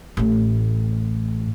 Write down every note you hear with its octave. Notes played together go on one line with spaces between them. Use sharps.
A1 A2